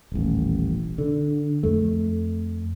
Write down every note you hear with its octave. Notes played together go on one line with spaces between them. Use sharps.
D#1 A1
D3
F2 A3